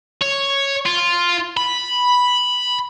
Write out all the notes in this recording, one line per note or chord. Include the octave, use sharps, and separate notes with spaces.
C#5
F4
B5